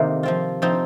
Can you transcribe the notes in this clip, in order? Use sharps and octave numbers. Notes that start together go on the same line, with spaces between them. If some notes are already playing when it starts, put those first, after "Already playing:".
Already playing: C3 D#3 A#3
F3 C4 F4
F3 C4 D#4